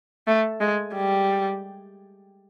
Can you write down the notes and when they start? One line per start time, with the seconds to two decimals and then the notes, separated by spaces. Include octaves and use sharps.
0.27 A3
0.61 G#3
0.95 G3